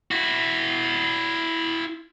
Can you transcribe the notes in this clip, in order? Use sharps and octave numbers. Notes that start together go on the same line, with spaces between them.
E4 F#4